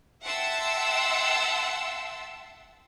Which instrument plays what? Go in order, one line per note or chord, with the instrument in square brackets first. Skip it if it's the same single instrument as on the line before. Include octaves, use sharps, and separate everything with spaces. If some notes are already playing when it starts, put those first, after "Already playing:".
[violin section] E5 F#5 G5 A5 C6 E6